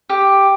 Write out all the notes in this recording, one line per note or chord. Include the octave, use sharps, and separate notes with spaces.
G4